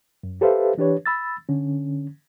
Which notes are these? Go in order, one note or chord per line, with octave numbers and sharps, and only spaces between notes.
F#2
G4 A4 B4 C5 E5 F5
E3 D4 G4 B4 C#5
B5 E6 A6
D3 C#4